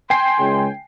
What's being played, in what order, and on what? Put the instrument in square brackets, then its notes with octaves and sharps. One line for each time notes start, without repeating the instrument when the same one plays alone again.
[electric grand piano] G5 G#5 C7 [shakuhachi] C6
[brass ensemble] C#2